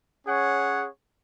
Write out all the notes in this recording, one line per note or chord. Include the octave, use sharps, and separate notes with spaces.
C#4 G#4 C#5 F#5